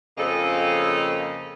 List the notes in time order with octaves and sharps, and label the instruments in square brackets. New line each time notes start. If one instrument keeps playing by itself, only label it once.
[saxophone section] F2 C#3 A#3 C4 A4 D#5